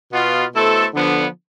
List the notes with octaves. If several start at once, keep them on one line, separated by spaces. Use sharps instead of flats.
B2 B3 F4
B2 A3 E4 A4 C5
D3 F3 B3